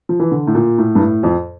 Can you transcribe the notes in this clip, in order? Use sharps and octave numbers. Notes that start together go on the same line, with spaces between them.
F3
E3
D3
A2
A#2
A2
G2
A2
F2